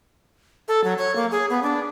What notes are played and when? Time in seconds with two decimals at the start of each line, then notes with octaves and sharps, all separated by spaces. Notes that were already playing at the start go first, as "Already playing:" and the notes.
0.68 A4
0.84 F#3
0.98 C#5
1.16 A#3
1.31 G#4
1.50 B3
1.63 D4